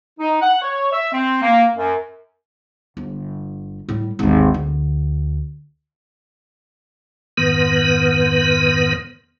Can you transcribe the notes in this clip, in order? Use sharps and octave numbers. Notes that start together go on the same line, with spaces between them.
D#4
F#5
C#5
E5
C4
A#3
F#2
G1
A2 G3
G#1 D#2
D2
F2 G#2 D#3 B3 B4